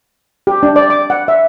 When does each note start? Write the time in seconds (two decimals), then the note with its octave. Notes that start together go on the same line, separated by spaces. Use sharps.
0.47 G4
0.63 D4
0.76 D5
0.90 D6
1.10 F#5
1.28 E5